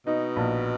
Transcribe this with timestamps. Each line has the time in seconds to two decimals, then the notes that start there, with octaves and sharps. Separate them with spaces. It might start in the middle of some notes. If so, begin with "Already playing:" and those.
0.07 B2 D#4
0.36 A#1